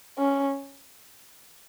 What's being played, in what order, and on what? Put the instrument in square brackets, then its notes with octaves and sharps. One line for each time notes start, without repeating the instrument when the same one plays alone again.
[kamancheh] C#4